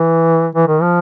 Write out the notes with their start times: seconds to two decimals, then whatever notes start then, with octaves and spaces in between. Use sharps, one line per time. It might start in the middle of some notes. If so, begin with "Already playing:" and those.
Already playing: E3
0.55 E3
0.67 D#3
0.81 F3